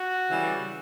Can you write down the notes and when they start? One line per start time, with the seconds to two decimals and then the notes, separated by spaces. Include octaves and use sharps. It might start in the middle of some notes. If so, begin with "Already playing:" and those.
Already playing: F#4
0.29 C#3 E3 G3